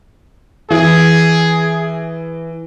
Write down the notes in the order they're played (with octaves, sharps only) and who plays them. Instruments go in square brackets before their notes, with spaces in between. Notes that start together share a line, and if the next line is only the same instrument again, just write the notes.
[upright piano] E3 [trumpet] G#4